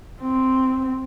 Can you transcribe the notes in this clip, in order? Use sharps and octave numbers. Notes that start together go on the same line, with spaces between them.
C4